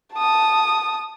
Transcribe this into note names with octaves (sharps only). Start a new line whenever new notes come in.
A5 D#6